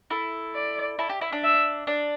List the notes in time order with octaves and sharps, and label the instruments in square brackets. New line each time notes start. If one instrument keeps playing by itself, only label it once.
[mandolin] E4 A4
[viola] D5
[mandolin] E4 A4
G4
E4
D4
[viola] E5
[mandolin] D4